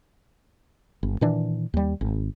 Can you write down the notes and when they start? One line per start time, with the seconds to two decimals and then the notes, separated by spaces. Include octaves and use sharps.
1.03 G1
1.21 A#2 D#3 E3 D4
1.74 D#2 G3
2.01 G#1